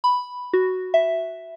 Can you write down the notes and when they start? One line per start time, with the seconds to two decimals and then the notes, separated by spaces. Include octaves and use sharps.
0.04 B5
0.53 F#4
0.94 E5